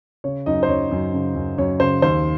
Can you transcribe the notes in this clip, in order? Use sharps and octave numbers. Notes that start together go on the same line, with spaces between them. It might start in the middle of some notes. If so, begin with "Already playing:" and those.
C#3 C#5
F#2 D#4 D#5
C5
F#2 C#5
F#2
C#3
F#2
F#2 C#5
C#3 C5
D#2 C5